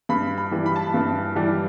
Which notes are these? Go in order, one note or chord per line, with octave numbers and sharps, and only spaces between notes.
G2 B5
B5
E3 G3
B5
A5
B5
G2
E3 G3